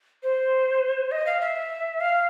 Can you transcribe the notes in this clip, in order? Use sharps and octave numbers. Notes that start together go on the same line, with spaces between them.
C5
D#5
F5
E5
F5